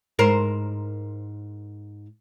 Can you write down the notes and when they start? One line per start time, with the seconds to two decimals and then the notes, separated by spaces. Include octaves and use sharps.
0.19 G#2 A#4 C5